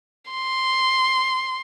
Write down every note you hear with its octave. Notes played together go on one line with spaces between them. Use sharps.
C6